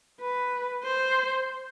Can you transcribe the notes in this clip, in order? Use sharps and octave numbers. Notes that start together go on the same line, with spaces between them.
B4
C5